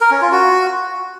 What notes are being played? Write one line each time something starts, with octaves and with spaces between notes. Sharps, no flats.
A#4
C#4
F4
F#4